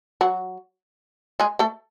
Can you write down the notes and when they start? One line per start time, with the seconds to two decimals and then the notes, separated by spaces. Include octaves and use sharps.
0.21 F#3 F#4
1.40 G#3 G#4
1.59 A3 A4